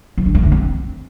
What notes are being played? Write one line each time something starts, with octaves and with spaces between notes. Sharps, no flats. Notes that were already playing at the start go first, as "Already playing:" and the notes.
E3
D3
A3
D3
C4